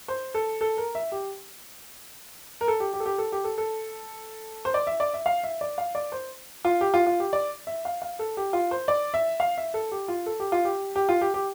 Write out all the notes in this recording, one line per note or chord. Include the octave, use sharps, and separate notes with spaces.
C5
A4
A4
A#4
E5
G4
A#4
A4
G4
G4
A4
G4
A4
G4
A4
A4
C5
D5
E5
D5
E5
F5
E5
D5
F5
D5
C5
F4
G4
F4
F4
G4
D5
E5
F5
F5
A4
G4
F4
C5
D5
E5
F5
E5
A4
G4
F4
A4
G4
F4
G4
G4
F4
G4
G4